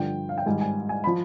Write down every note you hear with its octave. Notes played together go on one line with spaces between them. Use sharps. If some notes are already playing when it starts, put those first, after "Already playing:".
Already playing: G2 D3 F3 G5
F5
G5
G#2 D#3 G3 G#5
G#5
G#5
F3 B5